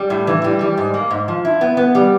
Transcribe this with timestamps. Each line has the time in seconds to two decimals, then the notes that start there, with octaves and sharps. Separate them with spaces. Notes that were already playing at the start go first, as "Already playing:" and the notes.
Already playing: G3
0.10 A2
0.27 E3
0.44 G3
0.61 G3
0.77 G#2
0.94 A#3
1.11 G#2
1.28 F3
1.45 E4
1.61 B3
1.77 B3
1.95 G3